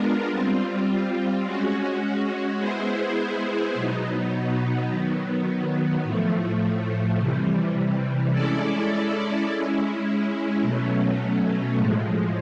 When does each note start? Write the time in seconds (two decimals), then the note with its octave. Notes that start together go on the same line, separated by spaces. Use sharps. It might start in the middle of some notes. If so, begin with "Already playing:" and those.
Already playing: G#3 B3 D4 F4 A#4
0.29 G3 C4 F4
1.45 G#3 C#4 F#4
2.59 G#3 B3 E4 G#4 C5
3.74 B2 F#3 B3 D#4
4.89 D#3 F#3 B3
6.03 A2 F3 A3
7.18 C3 E3 G3
8.32 G#3 C#4 E4 A4 D5
9.47 G#3 C#4 E4
10.61 B2 F#3 A3 C#4
11.76 A2 F3 G#3